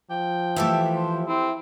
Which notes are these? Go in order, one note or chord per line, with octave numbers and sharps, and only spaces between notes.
F3 G5
E3 A3 G4 A4 E5
C5
C4 E4